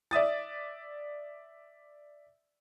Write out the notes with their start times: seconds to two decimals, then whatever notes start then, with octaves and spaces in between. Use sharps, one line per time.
0.11 D5 E5 D#6 A6